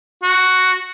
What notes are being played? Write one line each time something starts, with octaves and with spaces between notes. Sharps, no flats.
F#4